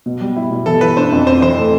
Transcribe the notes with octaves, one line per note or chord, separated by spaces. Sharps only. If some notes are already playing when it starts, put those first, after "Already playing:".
B2
G3
E4
B2
E3 A4
E3 B4
D4 C5
F2
C4 C5
E3 C5
A3